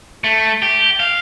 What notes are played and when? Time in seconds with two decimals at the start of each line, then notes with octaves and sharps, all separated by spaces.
0.24 A3
0.62 G4
1.00 F5